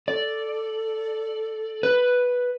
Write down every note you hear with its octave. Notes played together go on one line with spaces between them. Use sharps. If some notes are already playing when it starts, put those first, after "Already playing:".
A4 D5
B4